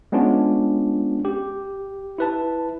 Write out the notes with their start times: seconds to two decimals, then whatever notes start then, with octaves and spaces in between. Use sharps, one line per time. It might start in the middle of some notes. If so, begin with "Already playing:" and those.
0.12 G#3 B3 C#4 D4 F4
1.25 G4
2.18 E4 B4 A5